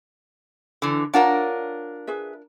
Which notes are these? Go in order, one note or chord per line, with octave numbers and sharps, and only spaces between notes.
D3 E3
D4 F4 A#4 C#5 F#5 A5
G#4 B4 E5